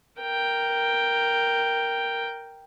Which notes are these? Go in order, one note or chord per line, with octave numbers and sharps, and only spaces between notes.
A#4 G5